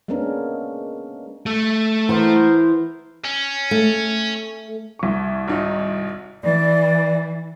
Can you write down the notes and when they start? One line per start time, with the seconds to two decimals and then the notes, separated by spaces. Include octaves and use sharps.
0.08 G#3 A#3 B3 C#4 D4 A#4
1.46 A3
2.09 E3 B3 A#4 C5
3.24 C#4
3.71 A3
4.99 C2 C#6
5.48 G#1 D#4
6.44 E3 D5